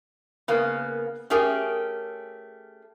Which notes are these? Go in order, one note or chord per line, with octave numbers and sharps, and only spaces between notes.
C#3 A#3 B3
A3 C#4 G4 G#4 A#4